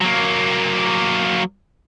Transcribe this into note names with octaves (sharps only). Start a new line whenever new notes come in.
F#3 A#3